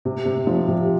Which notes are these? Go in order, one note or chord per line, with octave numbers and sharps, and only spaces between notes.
C3
C3
F3
C3